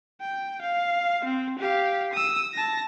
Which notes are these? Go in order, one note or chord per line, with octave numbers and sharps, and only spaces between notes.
G5
F5
C4
G4 F5
D#6 E6
A5 A#6